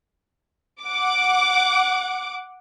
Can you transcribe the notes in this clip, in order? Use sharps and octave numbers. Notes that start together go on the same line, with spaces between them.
F#5 D6